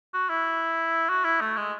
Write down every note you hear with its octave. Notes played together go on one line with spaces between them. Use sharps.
F#4
E4
F#4
E4
A3
G#3